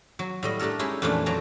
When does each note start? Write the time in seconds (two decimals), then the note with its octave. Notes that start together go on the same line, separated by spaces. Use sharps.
0.19 F#3
0.43 A2 G3 D#5
0.59 A3 D4 G4 A4 A#4
0.79 G#3 C#4 D#4 E4 G4
1.02 F2 A#2 E3 A3 C#4 D4
1.26 F2 F#3 D5 A#5